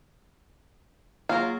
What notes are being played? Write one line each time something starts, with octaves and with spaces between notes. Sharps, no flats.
F#3 A#3 F4 G#4 A#4